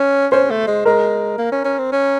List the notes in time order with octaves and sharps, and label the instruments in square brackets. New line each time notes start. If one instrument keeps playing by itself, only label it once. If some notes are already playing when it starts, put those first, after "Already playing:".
Already playing: [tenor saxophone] C#4
[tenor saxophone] C#4 [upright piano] C5
[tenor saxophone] A3
G#3
[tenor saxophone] G#3 [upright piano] A#4
[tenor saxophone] A#3
C#4
C#4
C4
C#4